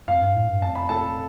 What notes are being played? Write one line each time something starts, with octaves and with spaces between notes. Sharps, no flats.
F2 F5
G2
A2
G2
F2 A5
B5
A4 A5